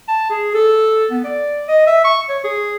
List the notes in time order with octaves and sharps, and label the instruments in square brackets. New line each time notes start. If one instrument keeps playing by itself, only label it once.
[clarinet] A5
G#4
A4
B3
D5
D#5
E5
C#6
C#5
G#4